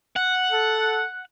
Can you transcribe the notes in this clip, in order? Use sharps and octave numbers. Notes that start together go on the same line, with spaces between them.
F#5
A4